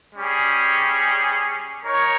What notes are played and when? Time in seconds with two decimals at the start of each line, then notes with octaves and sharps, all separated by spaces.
0.15 G3 C#4 G#4
1.85 D#4 A#4 C#5